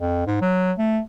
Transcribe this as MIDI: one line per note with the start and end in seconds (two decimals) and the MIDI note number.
0.01 0.26 41
0.26 0.37 44
0.41 0.72 54
0.78 1.00 57